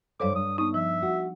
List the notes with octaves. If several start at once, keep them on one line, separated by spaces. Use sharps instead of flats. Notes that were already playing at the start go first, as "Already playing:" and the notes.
G2 A4 C5 C#5 F5 D6
G2 D#6
B3 D#4 D#6
F3 E5
F#4